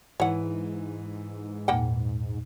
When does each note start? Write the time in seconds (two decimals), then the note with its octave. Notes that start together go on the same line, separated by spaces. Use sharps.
0.20 G#2 E3 C#5 F#5
1.68 E2 A#2 A#3 F#5 G5